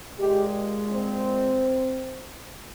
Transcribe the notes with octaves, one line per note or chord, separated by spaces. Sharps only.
A#2 G#3 G4
C4